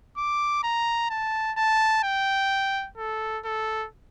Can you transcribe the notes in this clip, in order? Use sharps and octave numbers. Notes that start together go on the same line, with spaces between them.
D6
A#5
A5
A5
G5
A4
A4